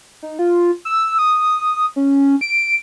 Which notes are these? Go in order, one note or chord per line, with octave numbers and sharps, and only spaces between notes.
D#4
F4
E6
D#6
C#4
D7